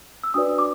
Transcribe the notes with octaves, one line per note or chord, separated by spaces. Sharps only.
E6
D4 F#4 B4 D5 D#6
D6